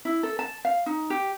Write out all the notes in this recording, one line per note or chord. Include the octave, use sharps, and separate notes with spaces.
E4
A4
A5
F5
D#4
G4